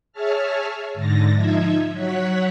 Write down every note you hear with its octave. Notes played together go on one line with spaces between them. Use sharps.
G#4 C#5 E5 A5 F6
G#2 D3 A6 A#6
F3 D#4 E5 G#6
F#3 C#5 F#5 F#6 B6